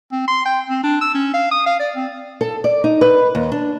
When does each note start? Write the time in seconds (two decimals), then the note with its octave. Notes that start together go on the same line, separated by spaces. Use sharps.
0.12 C4
0.28 C6
0.45 G5
0.69 C4
0.83 D4
1.01 E6
1.14 C#4
1.34 F5
1.51 D#6
1.66 F5
1.80 D5
1.95 C4
2.41 A4
2.64 D5
2.84 D#4
3.01 B4
3.35 D#2
3.52 D4